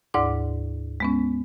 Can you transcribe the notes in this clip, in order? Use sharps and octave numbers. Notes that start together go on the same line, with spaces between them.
D2 G#2 E4 D5 D6
G#3 B3 C#4